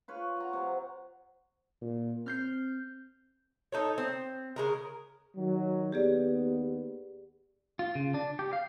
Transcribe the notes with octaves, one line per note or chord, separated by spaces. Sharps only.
F4 B4 C#5
F#4 A#5
C3 F#3
A#2
C4 F6 G6 C7
D#4 A4 C#5
C4
C#3 G#3 A#4
D#3 F#3
D#2 B3 G4 G#4 D5
F4
C#3
D4
G4
F5